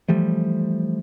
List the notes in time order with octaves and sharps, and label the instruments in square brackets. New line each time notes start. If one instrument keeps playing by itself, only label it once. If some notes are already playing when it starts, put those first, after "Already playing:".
[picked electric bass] E3 F3 G3 A3